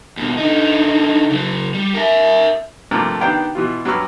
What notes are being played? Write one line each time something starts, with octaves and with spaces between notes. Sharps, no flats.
D#2 B2
D3 D#4
C#3 F#3
G3
A#4 E5
G2 C3 F3 A3 A#3
D#3 B3 D4 G4 F5 G5
B2 E3 F4
G2 F#3 B4 C#6 E6 F6